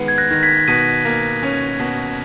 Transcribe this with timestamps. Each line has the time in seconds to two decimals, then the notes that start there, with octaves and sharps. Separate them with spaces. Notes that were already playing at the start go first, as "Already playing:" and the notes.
Already playing: D#3 G#3 B3
0.08 G#6
0.18 F#6 A#6
0.31 D#3 A#6
0.43 G#6 B6
0.68 B2 B6 D#7
1.05 A#3
1.43 C#4
1.79 B2